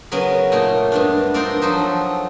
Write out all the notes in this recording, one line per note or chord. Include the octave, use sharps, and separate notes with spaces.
C#3 F#3 B3 C#4 A#4
A#2 A3 D#4
G2 B3 D4
C4 D4 D#4 F4 A#4 D5
F3 F#3 D#4 A4